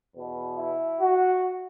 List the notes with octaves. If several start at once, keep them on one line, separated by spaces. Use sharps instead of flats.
E2 B2
E4
F#4